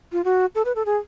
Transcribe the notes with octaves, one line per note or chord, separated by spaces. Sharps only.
F4
F#4
A4
B4
A4
G#4